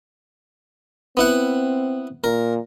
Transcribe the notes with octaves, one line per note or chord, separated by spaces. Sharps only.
B3 C4 E4 F#5
A#2 A#4